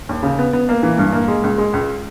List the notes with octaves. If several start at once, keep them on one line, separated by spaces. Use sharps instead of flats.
D#2
C#3
B3
B3
A#3
E3
G2
A#3
G#3
C#2
G#3
C#2